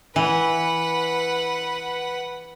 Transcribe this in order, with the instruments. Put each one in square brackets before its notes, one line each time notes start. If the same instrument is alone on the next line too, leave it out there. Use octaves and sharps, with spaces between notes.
[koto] E3 [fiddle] B4 F#5